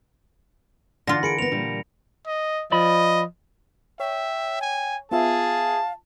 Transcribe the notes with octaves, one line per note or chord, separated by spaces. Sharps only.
D3 E3 D4 F4 F5 F#5 A#6
G#4 A#4 B5 C#7 D7
B3 C4 A#6 F7
A#2 G3 A#3 D4
D#5
F3 D5 D#5 B5
C#5 E5 G5
G#5
B3 F4 G#4 E5 F5 A5